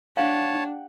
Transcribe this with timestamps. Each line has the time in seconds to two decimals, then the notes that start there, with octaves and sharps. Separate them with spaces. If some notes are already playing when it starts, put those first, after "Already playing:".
0.17 D4 G4 C#5 F5 F#5 A5